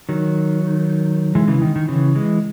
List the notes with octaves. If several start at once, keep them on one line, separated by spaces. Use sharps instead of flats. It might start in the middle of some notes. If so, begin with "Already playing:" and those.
D#3 F#3
E3 G#3
C#3 E3
D#3
D#3
C#3 E3
E3 G#3